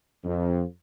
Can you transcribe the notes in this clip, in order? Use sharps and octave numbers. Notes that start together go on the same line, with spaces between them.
F2